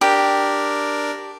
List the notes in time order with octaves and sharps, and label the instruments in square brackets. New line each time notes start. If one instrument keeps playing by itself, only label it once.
[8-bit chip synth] D4 A#4 D5 [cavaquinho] G4